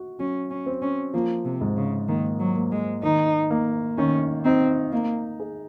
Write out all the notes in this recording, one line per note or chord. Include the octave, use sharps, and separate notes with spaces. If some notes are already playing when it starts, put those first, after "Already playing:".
Already playing: F#4
F#3 C#4
C#4
C4
C#4
F3 A#3
C3
G#2
C#3
D#3 A#3
F#3
A#3
G#3
D#3 D#4
A#3
D#3 C#4
C4 D#4
A#3 D#4
G#4